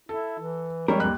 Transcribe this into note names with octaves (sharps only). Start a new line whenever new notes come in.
E4 A4
E3
F2 G3 G#3 A#4 C#5
D#2 G3 F#6